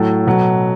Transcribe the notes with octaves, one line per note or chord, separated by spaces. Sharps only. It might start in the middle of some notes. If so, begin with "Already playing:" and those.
Already playing: A2 F#3 A4
B2 F#3